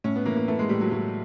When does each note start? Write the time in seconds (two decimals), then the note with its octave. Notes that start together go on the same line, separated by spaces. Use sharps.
0.04 A2 C#4
0.16 B3
0.25 E3 A#3
0.37 A#3
0.48 E3 A3
0.59 G#3
0.69 A2 G3
0.81 F#3
0.92 A2 F#3